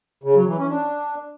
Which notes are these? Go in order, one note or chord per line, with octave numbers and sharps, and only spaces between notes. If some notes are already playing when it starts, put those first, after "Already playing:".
C#3
F#3
E3
C#4
D4